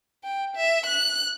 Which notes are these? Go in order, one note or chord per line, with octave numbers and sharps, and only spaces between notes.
G5
E5
F#6